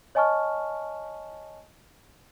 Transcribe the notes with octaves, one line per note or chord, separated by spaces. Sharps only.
C#5 D#5 G#5 A5 C#6 F6